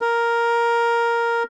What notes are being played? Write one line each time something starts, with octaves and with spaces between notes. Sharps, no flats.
A#4